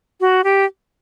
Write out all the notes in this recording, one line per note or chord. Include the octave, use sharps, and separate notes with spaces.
F#4
G4